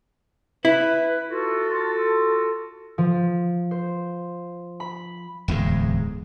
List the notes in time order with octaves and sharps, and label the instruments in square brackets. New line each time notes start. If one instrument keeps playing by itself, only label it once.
[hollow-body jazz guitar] E4 [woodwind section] B4
[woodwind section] F4 F#4 A4
[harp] F3
C5
B5
[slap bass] D1 E2 G#2 G#3